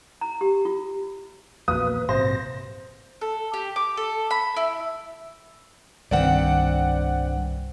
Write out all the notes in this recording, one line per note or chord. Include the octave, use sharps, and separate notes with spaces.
A#5
G4
F4
A#1 E2 A#3 B4 D#6
A#1 G#2 C3 C5 A#6
A4
G4
D6
A4
B5
E4
C2 G2 D#3 C4 D5 F#5